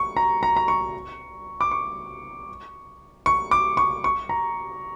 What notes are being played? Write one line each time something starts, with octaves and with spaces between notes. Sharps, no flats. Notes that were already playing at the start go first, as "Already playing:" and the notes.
Already playing: C#6
A#5
A#5
A#5
C#6
D6
C#6
C#6
D6
C#6
C#6
A#5